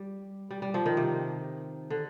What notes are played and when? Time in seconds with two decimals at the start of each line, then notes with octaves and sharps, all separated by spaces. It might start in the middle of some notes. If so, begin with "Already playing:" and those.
Already playing: G3
0.51 G3
0.62 G3
0.74 F3
0.86 D#3
0.97 C3
1.90 D3